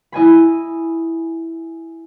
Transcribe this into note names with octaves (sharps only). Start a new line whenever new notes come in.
E4 D#5 G#5 B5